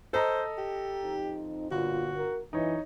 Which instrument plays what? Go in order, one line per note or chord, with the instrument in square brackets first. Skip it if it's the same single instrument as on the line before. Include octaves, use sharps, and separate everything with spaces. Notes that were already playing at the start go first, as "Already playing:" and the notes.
[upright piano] A4 D#5 A#5 [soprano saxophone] C5
[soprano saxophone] G4
[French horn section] F2 C4 D#4
[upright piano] G1 [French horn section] A#2 F4 [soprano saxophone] F#4
[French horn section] A#4
[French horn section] F#2 E3 [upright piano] D#4 C#5 D#5